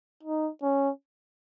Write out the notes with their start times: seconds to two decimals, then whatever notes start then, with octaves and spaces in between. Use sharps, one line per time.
0.23 D#4
0.62 C#4